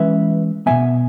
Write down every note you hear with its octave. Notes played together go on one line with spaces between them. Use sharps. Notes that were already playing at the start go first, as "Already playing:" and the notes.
Already playing: E3 G#3 C#4 E4 B4 E5
B2 F#3 B3 E5 G#5